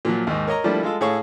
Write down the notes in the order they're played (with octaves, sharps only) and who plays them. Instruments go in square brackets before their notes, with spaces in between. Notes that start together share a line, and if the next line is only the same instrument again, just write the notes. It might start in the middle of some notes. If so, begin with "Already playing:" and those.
[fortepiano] A#2 F3 F#3
D#2 G#2
A#4 C#5 D#5 A#5
F3 G3 A3 A#3 D4 E4
G#3 F4 A4
A2 G#4 A4 C#5 F5 C#6